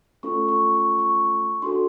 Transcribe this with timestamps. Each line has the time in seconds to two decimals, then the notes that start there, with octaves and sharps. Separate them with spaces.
0.23 A3 C#4 F4 A4 C#6
0.49 C#6
0.74 C#6
0.99 C#6
1.62 D4 F#4 A4 C6